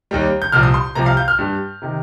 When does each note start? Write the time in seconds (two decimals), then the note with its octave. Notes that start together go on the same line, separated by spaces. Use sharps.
0.11 D#2 D#3 G3
0.42 G6
0.52 C2 A#2 F3 F6
0.63 D#6
0.74 C6
0.95 C2 C3 F3 A#5
1.06 F5
1.17 G6
1.28 F6
1.39 G2 G3
1.82 C3 D#3